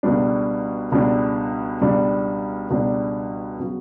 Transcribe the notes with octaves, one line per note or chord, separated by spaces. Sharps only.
C#2 B2 G3 D4
C#2 B2 G3 D4
C#2 B2 G3 D4
C#2 B2 G3 D4
C#3 F#3 B3 F#4